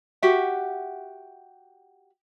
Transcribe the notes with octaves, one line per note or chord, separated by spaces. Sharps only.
F#4 G4 E5 F#5